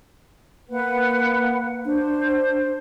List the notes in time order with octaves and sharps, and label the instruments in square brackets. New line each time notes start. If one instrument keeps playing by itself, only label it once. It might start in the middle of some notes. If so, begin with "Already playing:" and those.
[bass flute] A#3 [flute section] B4 F#5
[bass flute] D4 [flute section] C5